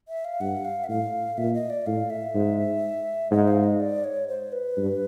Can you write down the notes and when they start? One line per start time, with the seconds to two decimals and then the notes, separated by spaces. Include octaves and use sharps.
0.08 E5
0.25 F5
0.40 G2 F#5
0.65 F5
0.84 E5
0.89 A2 F5
1.38 A#2 E5
1.54 D#5
1.70 D5
1.86 A2 F5
2.10 E5
2.34 G#2
3.31 G#2 D#5
3.48 F5
3.64 D#5
3.80 D5
4.04 C#5
4.28 C5
4.52 B4
4.77 G2